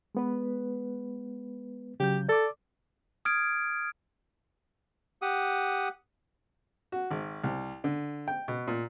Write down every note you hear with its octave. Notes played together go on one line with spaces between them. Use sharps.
G#3 B3 B4
C#3 F#3 G4 G6
A4 D5 D6
D#6 F6 G#6 D7
G4 F#5 D#6
F#4
G#1
C2
D3
G5
B2
A#2